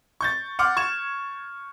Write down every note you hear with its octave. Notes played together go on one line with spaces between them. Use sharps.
C#6 G6 A6
F#5 C6 D6 F6
C#6 G#6 E7